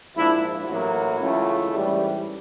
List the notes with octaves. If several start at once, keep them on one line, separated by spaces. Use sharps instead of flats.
A#1 G#2 F3 D4 E4
A1 A2 F#3 A#3 E4 F#4
C#2 C#3 E3 A3
A1 G#2 E3 G3